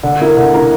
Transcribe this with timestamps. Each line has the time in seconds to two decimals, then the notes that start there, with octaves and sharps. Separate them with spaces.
0.03 D3
0.20 A#3 E4 A#4
0.37 D3
0.53 A#3 E4 A#4